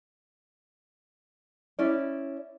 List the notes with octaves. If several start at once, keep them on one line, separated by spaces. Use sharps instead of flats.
C#4 E4 D5